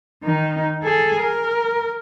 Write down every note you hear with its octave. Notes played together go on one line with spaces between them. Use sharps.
D#3 D#4
G#4 A4
A#4